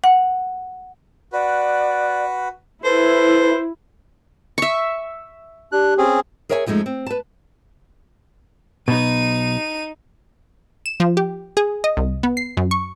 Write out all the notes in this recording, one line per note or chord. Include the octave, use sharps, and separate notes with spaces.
F#5
F#4 B4 D5
E4 A4 B4 C5
E5 C#6
D4 G4 F#6
C4 C#4 G#4
G#4 A#4 C#5 E5 F5 G#5
F2 F3 G#3 A3 D#4
C4
B4 A5
B1 B2 D#4 D#7
E7
F3
G4
G#4
D#5
C2
B3
C7
F#2
C#6